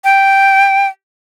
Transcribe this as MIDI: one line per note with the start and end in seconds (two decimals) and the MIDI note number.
0.04 0.87 79